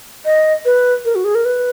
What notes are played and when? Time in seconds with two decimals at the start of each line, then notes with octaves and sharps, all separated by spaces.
0.25 D#5
0.65 B4
1.05 A#4
1.15 F#4
1.24 G#4
1.35 A#4
1.45 B4